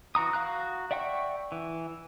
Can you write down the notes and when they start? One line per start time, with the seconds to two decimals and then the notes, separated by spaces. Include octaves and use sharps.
0.15 E3 F#4 A#5 D#6
0.33 F#4 F5 A#5 F#6
0.91 D5 E5 F#5 G5 C#6
1.52 E3